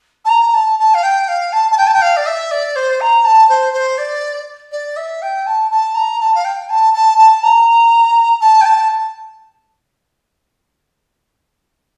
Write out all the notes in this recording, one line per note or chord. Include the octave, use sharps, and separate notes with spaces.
A5
A#5
A5
A5
F5
G5
F5
A5
A5
G5
A5
G5
F5
D5
E5
D5
C5
A#5
A5
C5
C5
D5
D5
E5
G5
A5
A5
A#5
A5
F5
G5
A5
A5
A5
A#5
A5
G5
A5